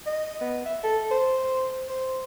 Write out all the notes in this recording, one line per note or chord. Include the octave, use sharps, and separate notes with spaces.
D#5
B3
E5
A4
C5
C5